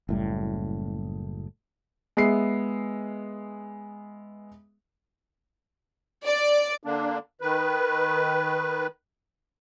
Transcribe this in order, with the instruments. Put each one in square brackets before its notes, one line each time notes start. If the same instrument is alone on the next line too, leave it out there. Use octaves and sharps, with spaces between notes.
[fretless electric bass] F#1 A2 G3
[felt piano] G#3 B3 E5 C7
[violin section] D5
[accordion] D3 A#3 D4
D#3 B4